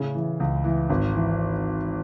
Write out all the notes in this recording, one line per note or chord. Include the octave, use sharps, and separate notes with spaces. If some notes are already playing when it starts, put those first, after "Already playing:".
Already playing: A2 C#3
E3
C#2
E3
G#1
E3